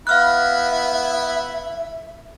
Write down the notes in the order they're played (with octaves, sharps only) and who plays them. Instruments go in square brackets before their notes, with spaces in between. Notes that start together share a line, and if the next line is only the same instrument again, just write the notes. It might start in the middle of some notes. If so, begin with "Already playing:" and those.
[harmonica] B3 E4 [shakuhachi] E5 [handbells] F5 F6 F#6